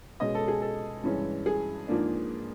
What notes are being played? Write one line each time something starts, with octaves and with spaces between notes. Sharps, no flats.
B2 G#3 C#4 D#5
A4
G#4
A4
G2 E3 G#3 C#4
G#4
G#2 F3 A#3 D4